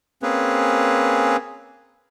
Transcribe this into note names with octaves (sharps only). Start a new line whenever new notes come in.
A#3 C4 C#4 G#4 B4